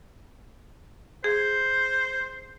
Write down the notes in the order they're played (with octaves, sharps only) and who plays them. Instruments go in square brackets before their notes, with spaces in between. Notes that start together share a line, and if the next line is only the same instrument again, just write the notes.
[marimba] G#4 [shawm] C5